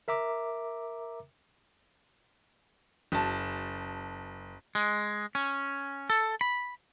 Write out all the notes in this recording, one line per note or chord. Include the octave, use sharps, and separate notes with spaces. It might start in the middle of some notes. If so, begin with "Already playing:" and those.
A#4 E5 A#5 D6
F#1 A5
G#3
C#4
A4
B5